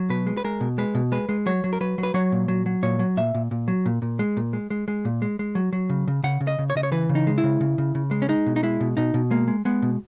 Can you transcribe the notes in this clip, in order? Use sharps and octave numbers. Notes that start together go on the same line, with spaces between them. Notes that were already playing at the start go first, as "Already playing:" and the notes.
Already playing: F#3
B2 B4
G#3
B4
G#3 A#4
B2
G#3 B4
B2
G#3 B4
G#3
F#3 C#5
F#3
A#4
F#3 B4
F#3
B4
F#3 C#5
A#2
F#3
F#3
A#2 C#5
F#3
A#2 E5
A#2
A#2
F#3
A#2
A#2
G#3
A#2
G#3
G#3
G#3
A#2
G#3
G#3
F#3
F#3
C#3
C#3
C#3 F#5
C#3
D#5
C#3
C#5
C#3 D#5
C#5
E3 B4
C#3
D#4
G#3
E4
C#3
C#3
C#3
C#3
G#3
C#4
G#3 D#4
B2
D#4
G#3 E4
B2
B2 D#4
B2
G#3 A#3
G#3
G#3 B3
B2